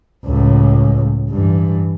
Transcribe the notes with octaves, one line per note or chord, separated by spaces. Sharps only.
C#2 A2
G2 E3